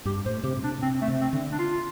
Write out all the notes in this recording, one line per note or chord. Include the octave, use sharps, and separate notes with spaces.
G2 G4
A2 C5
C3 G4
A2
C3 D4
C3 C4
A3
C3
C4
D3
D4
F4